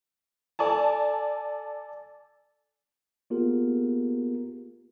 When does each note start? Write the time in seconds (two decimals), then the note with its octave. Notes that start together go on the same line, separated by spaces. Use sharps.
0.59 A4 D5 G#5 A5
3.30 A#3 B3 F4 G4 G#4 A#4